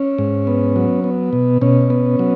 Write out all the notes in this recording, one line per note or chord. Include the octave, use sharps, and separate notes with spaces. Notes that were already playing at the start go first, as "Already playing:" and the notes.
Already playing: C#4
G#2
B3
F#3
B3
B2
B2 C#4
B3
F#3